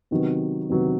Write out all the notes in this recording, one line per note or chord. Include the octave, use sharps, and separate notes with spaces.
C3 D#3 F#3 B3
C3 D#3 F#3 B3